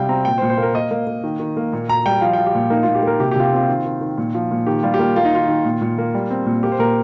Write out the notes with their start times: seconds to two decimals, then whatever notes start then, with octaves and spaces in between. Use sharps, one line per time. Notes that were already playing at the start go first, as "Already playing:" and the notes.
Already playing: C3 G3 F5 G5
0.09 C4 A#5
0.25 A#2 G5
0.38 C5
0.42 A#2
0.50 C5
0.58 A#3 A#4
0.74 A#3 D#5
0.91 A#3
1.07 A#3
1.24 D#3
1.40 D#3
1.57 A#3
1.73 A#2
1.88 A#2 A#5
2.06 G3 G5
2.21 F3 F5
2.33 F3 G5
2.46 G4
2.55 A#2
2.70 A#3 D#4
2.83 A#2 F4
2.95 G4
3.03 A#3 A#4
3.20 C3 G4
3.31 G4
3.36 C3 F4
3.45 G4
3.53 C4 F4
3.68 D#3
3.85 D#3
4.01 D#3
4.18 A#2
4.34 F3
4.51 A#2
4.67 D#3 G4
4.83 G3 F4
4.94 G4
4.99 A#3 F4
5.16 A#3 F4
5.25 D#4
5.33 D#3 F4
5.49 D#3
5.65 A#2
5.81 A#2
5.98 A#3
6.15 G3
6.30 C4
6.46 A#2
6.63 A#3 G4
6.72 C5
6.79 A#2 A#4